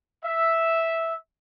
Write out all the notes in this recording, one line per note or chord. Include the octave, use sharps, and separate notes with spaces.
E5